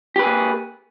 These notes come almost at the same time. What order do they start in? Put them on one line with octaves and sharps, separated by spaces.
G4 B4 G#4 A#3